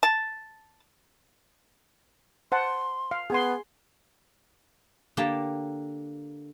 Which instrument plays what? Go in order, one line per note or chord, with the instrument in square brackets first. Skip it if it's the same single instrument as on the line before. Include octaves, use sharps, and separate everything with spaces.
[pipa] A5
[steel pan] C5 F#5 A5 [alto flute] C6
[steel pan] F5
[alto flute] B3 [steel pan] G#4 G#5 C6
[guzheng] D3 A#3 G4 G5 A5